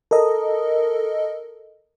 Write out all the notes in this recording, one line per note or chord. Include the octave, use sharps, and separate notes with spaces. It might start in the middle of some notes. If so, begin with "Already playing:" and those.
A4 A#4 D#5